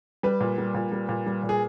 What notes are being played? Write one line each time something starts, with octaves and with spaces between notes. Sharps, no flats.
G3 B4
A#2
G3
A#2
G3
A#2
G3
A#2
G#4